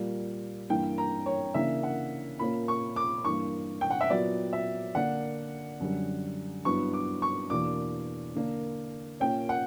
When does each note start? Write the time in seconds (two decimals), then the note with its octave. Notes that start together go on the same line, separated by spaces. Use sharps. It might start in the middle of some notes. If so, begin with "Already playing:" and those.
Already playing: A#2 G3 A#3
0.69 G2 E3 A#3 G5
0.98 A#5
1.26 C#5
1.54 C#3 E3 A#3 D4 E5
1.83 F#5
2.39 A#2 A#3 C#4 B5
2.68 C#6
2.96 D6
3.25 G2 E3 A#3 C#6
3.81 G5
3.90 F#5
4.01 E5
4.10 A#2 F#3 B3 D5
4.53 E5
4.95 D3 A#3 D4 F#5
5.80 F#2 D3 G3
6.65 G2 F#3 B3 E4 C#6
6.93 D6
7.22 C#6
7.50 E2 B2 A#3 D4 D6
8.35 D3 A#3 D4
9.20 A#2 A#3 C#4 G5
9.49 F#5